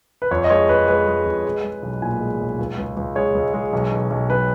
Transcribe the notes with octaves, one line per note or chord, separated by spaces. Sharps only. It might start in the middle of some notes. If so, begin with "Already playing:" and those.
B4
F2 C#5
D#5
G#3 C#5
F2 B4
G#3 B4
G#3
F2
G#3
G#3
B1
A#2 G#5
G#3
B1
C#2
C#2
C#2
G#3 C#5
C#2
G#3
B1
B1
B1
B1 B4